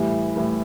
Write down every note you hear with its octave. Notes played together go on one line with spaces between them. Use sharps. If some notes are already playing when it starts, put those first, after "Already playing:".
Already playing: A2 E3 G3
A2 E3 G3